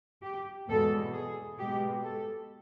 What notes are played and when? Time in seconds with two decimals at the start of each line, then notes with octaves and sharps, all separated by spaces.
0.23 G4
0.69 E2 B2 G#3 A4
1.14 G#4
1.59 B2 G#3 G4
2.04 A4